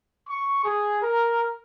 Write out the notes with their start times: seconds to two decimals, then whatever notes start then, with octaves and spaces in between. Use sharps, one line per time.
0.28 C#6
0.64 G#4
1.02 A#4